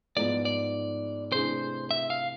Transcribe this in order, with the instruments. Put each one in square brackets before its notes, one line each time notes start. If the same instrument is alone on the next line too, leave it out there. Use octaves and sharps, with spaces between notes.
[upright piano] G#2 F3 G#3 B3 [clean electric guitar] D5
[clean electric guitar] D5
[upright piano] C3 E3 A3 D4 G#4 [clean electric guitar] C5
[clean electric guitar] E5
F5